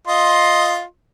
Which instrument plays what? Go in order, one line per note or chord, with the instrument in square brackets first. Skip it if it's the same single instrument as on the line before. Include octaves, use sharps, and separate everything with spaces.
[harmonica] F4 D#5 C6